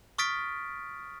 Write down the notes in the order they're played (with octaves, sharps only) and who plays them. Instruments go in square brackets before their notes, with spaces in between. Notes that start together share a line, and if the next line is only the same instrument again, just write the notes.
[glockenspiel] C#6 D#6 F6 A6 B6 D7